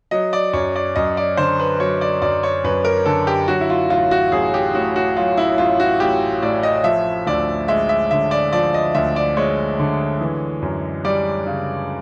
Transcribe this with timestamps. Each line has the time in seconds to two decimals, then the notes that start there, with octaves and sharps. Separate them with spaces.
0.11 F#3 D#5
0.33 D5
0.53 F#2 C#5
0.76 D5
0.96 F#2 D#5
1.17 D5
1.37 D3 C5
1.60 B4
1.80 F#3 C#5
2.01 D5
2.22 F#2 D5
2.43 C#5
2.64 F#2 B4
2.85 A#4
3.06 D3 A4
3.27 G4
3.48 F#3 F#4
3.61 E4
3.70 F4
3.90 A1 F4
4.11 F#4
4.32 A1 G#4
4.54 G4
4.74 A2 F#4
4.96 F#4
5.17 F#3 F4
5.37 E4
5.58 A1 F4
5.80 F#4
6.00 A1 G4
6.42 A2 D5
6.63 D#5
6.84 F3 E5
7.27 D2 D5
7.68 G#3 E5
7.89 E5
8.11 D3 E5
8.31 D5
8.53 F3 D5
8.74 D#5
8.95 D2 E5
9.16 D5
9.37 G#3 C#5
9.79 D3
10.21 E3
10.62 F#2
11.04 G3 D5
11.47 C#3